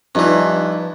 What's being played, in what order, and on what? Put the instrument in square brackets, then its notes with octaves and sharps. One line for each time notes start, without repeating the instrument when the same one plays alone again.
[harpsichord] G2 E3 [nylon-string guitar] F3 [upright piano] D#4